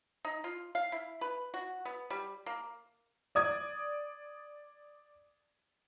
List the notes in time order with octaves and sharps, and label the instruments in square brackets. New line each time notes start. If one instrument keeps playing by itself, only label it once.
[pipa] D#4
F4
F5
E4
B4
F#4
B3
G3
A#3
[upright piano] D5 D#6 G#6